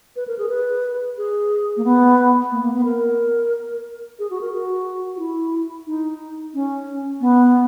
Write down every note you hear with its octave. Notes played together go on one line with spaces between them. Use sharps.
B4
A#4
G#4
B4
G#4
A#3
B3
A#3
A#3
B3
A#4
G#4
F#4
A#4
F#4
F#4
E4
D#4
C#4
B3